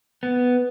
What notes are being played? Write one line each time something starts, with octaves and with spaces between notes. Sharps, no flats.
B3